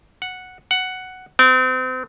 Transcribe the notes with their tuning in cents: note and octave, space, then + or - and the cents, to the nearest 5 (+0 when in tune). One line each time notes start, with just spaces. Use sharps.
F#5 -5
F#5 +5
C4 -35